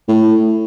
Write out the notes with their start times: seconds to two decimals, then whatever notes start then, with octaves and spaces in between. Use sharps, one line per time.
0.08 A2